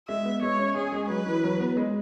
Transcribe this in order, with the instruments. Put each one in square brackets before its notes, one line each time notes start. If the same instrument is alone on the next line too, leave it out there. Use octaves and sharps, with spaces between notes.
[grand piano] G#3 [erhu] E5
[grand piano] B3
[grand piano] G#3 [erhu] C#5
[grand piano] C#4
[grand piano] C#4 [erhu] G#4
[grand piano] G#3
[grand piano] F#3 [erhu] B4
[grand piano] E3
F#3
B3
G#3